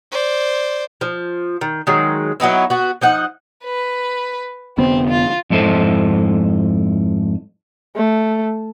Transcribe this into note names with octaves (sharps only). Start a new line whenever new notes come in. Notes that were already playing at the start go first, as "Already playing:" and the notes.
C5 D5
F3
D#3
D#3 F#3 G#3
F#3 B3 D#4 E4
B3 F#4
F3 D#4 F#5
B4
F1 D3 B3 C4
F4
F2 G#2 E4 A4 C5 D#5
A3